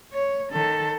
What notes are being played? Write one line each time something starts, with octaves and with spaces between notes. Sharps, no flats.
C#5
D#3 A4